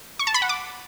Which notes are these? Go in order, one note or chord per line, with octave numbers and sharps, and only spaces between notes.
C#6
A5
B5
F#5
D6